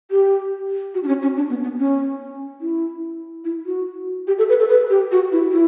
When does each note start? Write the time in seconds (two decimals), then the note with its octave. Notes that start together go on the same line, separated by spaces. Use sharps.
0.11 G4
0.94 F#4
1.03 D4
1.08 C#4
1.22 C#4
1.36 D4
1.50 B3
1.63 B3
1.78 C#4
2.61 E4
3.45 E4
3.66 F#4
4.28 G4
4.38 A4
4.49 B4
4.60 A4
4.69 B4
4.90 G4
5.12 F#4
5.32 E4
5.52 E4